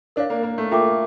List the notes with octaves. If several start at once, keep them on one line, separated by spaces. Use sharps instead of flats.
D4 A#4 C#5 F5
A#3
A#3
A3
A#3 F4 A4 E5 G5 D6